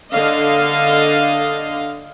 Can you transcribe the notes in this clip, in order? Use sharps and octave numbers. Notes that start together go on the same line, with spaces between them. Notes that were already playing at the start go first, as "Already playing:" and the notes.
D3 D#5 F5